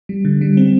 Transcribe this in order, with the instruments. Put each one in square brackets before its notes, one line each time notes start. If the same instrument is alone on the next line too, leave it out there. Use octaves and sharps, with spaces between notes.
[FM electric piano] G3
D3
G3
C4